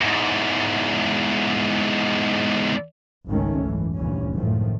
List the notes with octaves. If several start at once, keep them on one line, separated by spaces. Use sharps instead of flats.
E2 G#2
G#1 C#2 G#2 D#3 A3 C#4
F#1 G#2 E3
F1 D2 G2 A#2 E3 C#4
F#1 A2 D#3 F3 A3